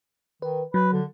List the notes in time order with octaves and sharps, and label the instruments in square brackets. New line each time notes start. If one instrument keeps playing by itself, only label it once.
[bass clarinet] D#3 [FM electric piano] B4
[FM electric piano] F#3 [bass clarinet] B4
[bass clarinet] D3